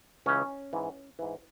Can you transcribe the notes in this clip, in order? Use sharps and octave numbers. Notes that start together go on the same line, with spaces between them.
C#2 C#3 E3 C#4
G#2 E3
G#2 E3